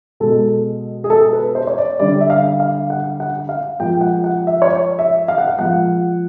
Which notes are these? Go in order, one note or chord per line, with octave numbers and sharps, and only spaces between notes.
B2 G#3 A4
G#4
A4
B4
C5
C#5
D5
D3 G3 D5
E5
F5
F5
F#5
F#5
F5
A#2 F3 G#3 G5
F#5
F#5
E5
C#5
D5
E5
F5
F#5
F5
A#2 F3 G#3 F#5